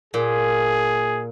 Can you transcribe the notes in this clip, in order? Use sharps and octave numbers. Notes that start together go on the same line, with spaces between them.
A#2 G#4